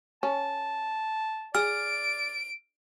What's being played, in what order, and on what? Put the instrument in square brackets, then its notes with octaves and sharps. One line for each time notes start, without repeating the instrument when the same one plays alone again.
[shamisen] C#4 [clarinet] A5
[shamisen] G#4 [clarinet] D5 [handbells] F6 [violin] D7